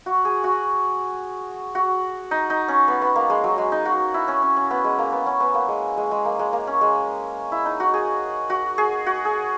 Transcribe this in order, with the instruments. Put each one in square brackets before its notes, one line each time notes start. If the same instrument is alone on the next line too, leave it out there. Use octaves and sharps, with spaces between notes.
[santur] F#4
G#4
F#4
F#4
D#4
D#4
C#4
B3
B3
A#3
G#3
F#3
G#3
D#4
F#4
E4
C#4
C#4
C#4
B3
G#3
A#3
B3
C#4
B3
A#3
G#3
G#3
G#3
A#3
G#3
A#3
C#4
G#3
E4
D#4
F#4
G#4
F#4
G#4
F#4
G#4